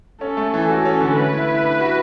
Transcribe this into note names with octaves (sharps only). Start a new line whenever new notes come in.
C#4 A4
A3
E3
F#4 A4
C#4
D3
A3 B4
E4
E4
D4
F#4